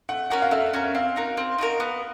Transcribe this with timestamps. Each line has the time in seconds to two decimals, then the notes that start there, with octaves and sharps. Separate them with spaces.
0.09 A3 F#5
0.30 C#4 F#4 A#4 F#5
0.42 F5
0.51 A3 E5
0.73 C#4 F#4 A#4
0.95 C4 F5
1.16 D#4 F#4 A#4
1.37 C4
1.58 D#4 F#4 A#4
1.80 B3